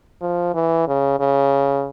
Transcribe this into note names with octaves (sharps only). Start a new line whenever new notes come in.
F3
E3
C#3
C#3